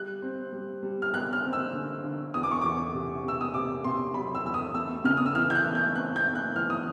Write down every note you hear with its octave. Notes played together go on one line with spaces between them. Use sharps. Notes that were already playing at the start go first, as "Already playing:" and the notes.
Already playing: G3 F#6
C4
G3
G3
F6
G3 F#6
F6
C4
E6
D3
D3
E2 D#6
D6
C#6
E2 D6
C3
C3 E6
D#6
C3 D6
C3 C6
F#3 B5
E6
E2 E6
D#6
A3 E6
C#3 F6
D#6
E6
E3 F6
G6
F#6
A3
G6
C4 F#6
G6
A3
F#6
E3 F6
D#6